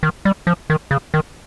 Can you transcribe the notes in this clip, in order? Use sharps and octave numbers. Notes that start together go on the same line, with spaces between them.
D#3
G3
F3
D#3
C#3
D#3